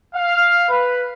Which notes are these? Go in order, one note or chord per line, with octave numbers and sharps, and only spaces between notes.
F5
B4